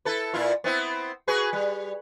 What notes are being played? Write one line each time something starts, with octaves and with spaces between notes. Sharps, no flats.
E4 A4 B4
A#2 E4 F4
B3 C4 E4
F#4 G#4 B4
G3